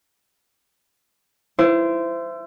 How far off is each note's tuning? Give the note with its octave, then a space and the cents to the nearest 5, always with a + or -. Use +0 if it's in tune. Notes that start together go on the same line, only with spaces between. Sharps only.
E4 +25 C5 -20